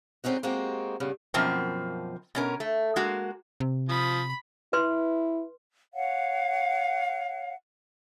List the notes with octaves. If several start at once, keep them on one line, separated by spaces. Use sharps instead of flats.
D3 G#3 C4 C#4 D#4 F#4
G#3 A#3 C4 F#4 G4
G2 C#3 B3
F#2 B2 F3 A#3 C4
B2 C#4 A#4
A3
G#3 A#3 F#4
C3
F3 B5 D#6
E4 B4 C6
C#5 F5 F#5